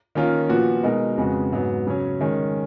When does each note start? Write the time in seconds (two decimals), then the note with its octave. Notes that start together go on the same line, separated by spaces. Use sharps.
0.15 D#3 A#3 C#4 F4 A#4
0.49 A#2 F3 B3 F#4
0.83 B2 G#3 D#4 A#4
1.18 F2 C#3 G#3 B3 F#4
1.52 G#2 F#3 B3
1.87 C#3 F#3 C#4
2.21 D#3 G#3 C#4